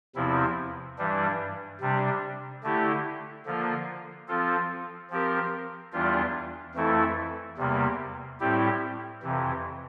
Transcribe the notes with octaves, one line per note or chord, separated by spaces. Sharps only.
E2 C3 F3 C4 E4
G2 E3 G3 D4
C3 G3 D4
D3 A3 E4 G4
D3 F3 A#3 F4
F3 C4 F4 A4
F3 C4 G4 A#4
E2 E3 G3 D4 F4
F2 E3 A3 E4 A4
E2 C3 G3 A#3
A2 G3 C4 E4 G4
F2 C3 E3